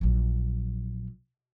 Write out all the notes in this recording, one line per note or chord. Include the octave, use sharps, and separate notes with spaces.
A#1 F#3